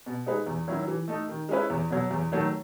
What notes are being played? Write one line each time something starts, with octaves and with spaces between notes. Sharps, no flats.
B2
G#3 D#4 G#4 B4
E2
D#3 F#3 C#4 E4
E3
A3 D#4
D#3
G#3 C#4 E4 B4
E2
B2 F#3
E2
D#3 F#3 A3